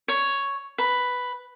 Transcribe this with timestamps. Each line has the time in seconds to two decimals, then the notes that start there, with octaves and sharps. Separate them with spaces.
0.08 C#5
0.78 B4